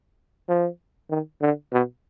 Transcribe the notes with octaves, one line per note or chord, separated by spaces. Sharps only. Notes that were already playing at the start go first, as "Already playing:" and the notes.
F3
D#3
D3
B2